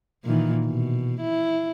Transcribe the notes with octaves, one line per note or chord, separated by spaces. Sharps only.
A#2 D#3 E3
B2
E4